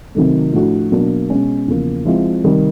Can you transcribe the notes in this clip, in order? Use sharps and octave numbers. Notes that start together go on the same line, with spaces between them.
C3 D#3 F#3 A3
A2 F3 A3 D4 F#4
B2 F#3 A#3 D4
B2 G#3 C#4
E2 C#3 F3 A#3
F3 G#3 C4 E4
C3 D#3 G3